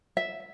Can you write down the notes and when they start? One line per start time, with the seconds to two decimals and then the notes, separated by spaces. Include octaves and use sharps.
0.17 E5